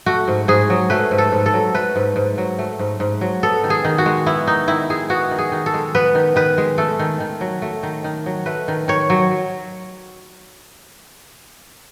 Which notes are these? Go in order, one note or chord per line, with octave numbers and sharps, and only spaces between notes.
A3 F#4
G#2
G#2 G#4
F#3
A3 B4
G#2
A4
G#2
A4
F#3
A3 B4
G#2
G#2
F#3
A3
G#2
G#2
F#3
B3 A4
D#3
G#4
D#3
F#4
G#3
B3 E4
D#3 D#4
D#3 E4
G#3 G#4
B3 F#4
D#3
G#4
D#3
A4
G#3
B3 B4
D#3
D#3 B4
G#3
A3 A4
D#3
D#3
F#3
A3
D#3
D#3
F#3
A3 B4
D#3
D#3 C#5
F#3